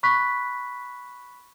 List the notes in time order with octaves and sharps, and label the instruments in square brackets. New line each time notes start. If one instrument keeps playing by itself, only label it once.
[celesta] B5 C#6 F#6 B6